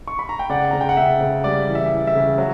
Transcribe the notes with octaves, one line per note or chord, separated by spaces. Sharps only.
C#6
B5
A#5
G5
C#3 D5 F#5
C#3 A#5
G5
F#5
C#3 E5
C#3
G3 D5
E3
E5
E3
E5
C#3
F#3